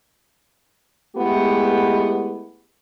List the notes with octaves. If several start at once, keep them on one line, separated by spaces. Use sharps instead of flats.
G#3 A3 B3 E4 G4